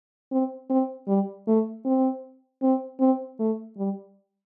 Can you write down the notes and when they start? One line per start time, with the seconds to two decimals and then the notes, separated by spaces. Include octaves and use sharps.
0.32 C4
0.70 C4
1.08 G3
1.47 A3
1.85 C4
2.63 C4
3.00 C4
3.39 A3
3.78 G3